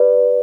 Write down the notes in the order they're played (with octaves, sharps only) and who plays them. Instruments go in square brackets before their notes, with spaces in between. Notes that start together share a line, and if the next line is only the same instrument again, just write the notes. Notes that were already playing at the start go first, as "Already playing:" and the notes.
Already playing: [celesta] G4 B4 D5